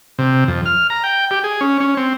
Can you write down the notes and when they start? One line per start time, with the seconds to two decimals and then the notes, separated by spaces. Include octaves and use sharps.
0.19 C3
0.48 F2
0.66 F6
0.90 A#5
1.04 G5
1.31 G4
1.44 G#4
1.61 C#4
1.80 C#4
1.97 C4